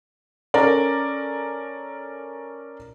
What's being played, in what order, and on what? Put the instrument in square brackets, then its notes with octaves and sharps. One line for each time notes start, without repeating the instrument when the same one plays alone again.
[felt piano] C#4 A4 A#4 D5